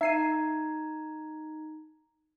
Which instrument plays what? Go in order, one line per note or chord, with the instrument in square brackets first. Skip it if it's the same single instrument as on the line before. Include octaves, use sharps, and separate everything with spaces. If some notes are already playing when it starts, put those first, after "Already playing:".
[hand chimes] D#4 A#5 G#6 [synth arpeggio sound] E5 C7 D#7